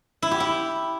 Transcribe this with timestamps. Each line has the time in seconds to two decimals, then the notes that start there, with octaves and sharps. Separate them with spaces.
0.22 E4
0.31 G4
0.40 E4